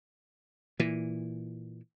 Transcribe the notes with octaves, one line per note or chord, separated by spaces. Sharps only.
A#2 E3